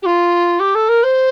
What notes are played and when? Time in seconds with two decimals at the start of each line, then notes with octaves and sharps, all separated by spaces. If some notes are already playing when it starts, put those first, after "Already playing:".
0.02 G4
0.05 F4
0.59 G4
0.74 A4
0.88 A#4
1.03 C5